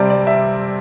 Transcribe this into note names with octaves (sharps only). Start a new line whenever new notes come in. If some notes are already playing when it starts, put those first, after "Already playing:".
Already playing: C3 G3 C4 D5 A5
D5
E5